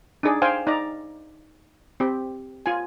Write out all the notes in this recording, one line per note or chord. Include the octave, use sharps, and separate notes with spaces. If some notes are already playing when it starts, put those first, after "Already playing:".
D4 D#4 G#4 D5
C5 F5 G5 G#5
D#4 D5 A#5
C4 G4
F4 G#5